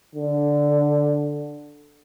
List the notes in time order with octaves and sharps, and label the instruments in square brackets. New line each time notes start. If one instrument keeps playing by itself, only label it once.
[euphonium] D3